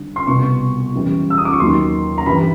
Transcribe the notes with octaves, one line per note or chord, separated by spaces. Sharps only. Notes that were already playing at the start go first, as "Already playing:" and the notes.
Already playing: D3 G3
C6
C2 B2 G3 C#6
F#2 C#3 E3 G3
E6
D#6
D6
C#6
D#2 D#3 F#3 C6
A#5
G2 E3 G3 B5